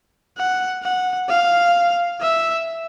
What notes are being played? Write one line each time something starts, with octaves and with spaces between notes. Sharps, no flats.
F#5
F#5
F5
E5